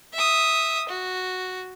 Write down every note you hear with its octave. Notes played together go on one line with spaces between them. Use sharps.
E5 D#6
F#4